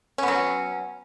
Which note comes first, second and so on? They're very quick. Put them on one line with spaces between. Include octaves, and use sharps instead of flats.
C#4 B3 F#3